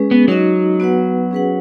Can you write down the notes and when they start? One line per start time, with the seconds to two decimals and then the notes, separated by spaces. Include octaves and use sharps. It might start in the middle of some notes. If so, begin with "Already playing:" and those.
Already playing: G#3 C#4 G#4 B4
0.11 B3
0.28 F#3 D#4 F#4 D#5
0.80 B3 F#4 B4 F#5
1.31 C#4 G#4 B4 F#5